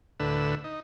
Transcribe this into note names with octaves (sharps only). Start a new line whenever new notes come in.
D2 A2 D3 B4 E6
D#4